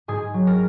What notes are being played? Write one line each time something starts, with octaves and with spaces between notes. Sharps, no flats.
G#2 G#4
F#3
A#4